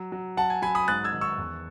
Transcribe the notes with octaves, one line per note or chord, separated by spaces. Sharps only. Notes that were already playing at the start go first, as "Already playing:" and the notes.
Already playing: F#3
F#3
F#3 F#5 A5
G#5
F#3 G#5 B5
B5 D#6
G#2 F#6 A6
E6 G#6
D#3
C#6 E6
E2